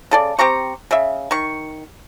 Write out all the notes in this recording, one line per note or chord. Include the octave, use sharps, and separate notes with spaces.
C#3 A4 D5
C4 G4 A#5 C#6
C#3 E5
D#3 C#6